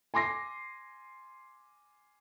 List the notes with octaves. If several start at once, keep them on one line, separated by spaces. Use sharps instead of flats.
G#5 C6 D6 A#6 C7